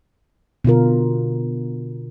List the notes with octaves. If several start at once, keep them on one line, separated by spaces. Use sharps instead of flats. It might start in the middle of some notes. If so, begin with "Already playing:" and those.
B2 D3 F4 A#4